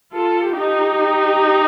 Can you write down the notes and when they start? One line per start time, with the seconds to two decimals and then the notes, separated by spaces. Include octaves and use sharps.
0.13 F4 A4
0.56 D#4 G4